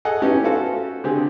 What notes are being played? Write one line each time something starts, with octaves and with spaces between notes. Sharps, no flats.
G#4 A4 D#5 F#5 G#5
B3 C#4 D#4 E4 G4
F4 F#4 A4 C5
D3 C4 G4 G#4